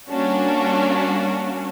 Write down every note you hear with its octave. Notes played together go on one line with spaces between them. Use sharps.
G3 A#3 C#4 D4 F#4